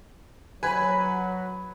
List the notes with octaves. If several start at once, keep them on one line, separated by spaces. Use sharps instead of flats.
F#3 B4 G#5 B5